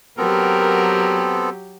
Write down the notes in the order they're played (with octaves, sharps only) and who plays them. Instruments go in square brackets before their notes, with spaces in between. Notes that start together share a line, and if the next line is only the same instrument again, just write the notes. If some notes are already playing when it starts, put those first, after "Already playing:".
[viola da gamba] F#3 G4 [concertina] B3 C4 A4 [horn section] A#4